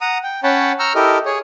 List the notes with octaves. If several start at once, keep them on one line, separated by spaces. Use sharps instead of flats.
F#5 A#5 D#6
G5
C#4 C#5 F#5 G5 A5 B5
A#5 C#6 E6 F6 G6
E4 G4 A4 A#4 D#5
G#4 C#5